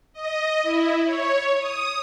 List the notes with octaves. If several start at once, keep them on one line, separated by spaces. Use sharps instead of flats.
D#5
E4
C#5
D#6